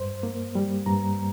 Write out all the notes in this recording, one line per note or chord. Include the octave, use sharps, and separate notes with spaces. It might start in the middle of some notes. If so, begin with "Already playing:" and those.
Already playing: G2 C5
A#3
G3
G2 A#5